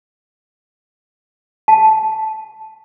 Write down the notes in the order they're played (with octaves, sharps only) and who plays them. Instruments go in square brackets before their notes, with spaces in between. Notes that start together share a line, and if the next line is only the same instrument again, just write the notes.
[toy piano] A5